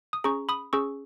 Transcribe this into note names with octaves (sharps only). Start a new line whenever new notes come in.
D#6
C#4 G#4 A#5 C#6
B5 D#6
C#4 G#4 C#6 E6